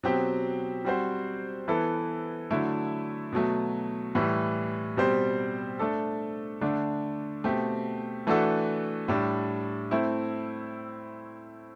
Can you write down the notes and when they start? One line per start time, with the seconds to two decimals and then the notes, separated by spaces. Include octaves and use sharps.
0.03 B2 F#3 C4 G4
0.85 G3 C4 F#4 C5
1.68 E3 B3 E4 A4
2.51 D3 F#3 A3 E4
3.32 B2 F#3 A3
4.15 A2 E3 G3
4.97 B2 G3 C4 G4 C5
5.79 A3 D4 A4
6.61 D3 A3 D4
7.44 B2 A3 C4 G4
8.27 E3 A3 D4 F#4 A4
9.08 A2 G3 D4
9.91 A3 C4 E4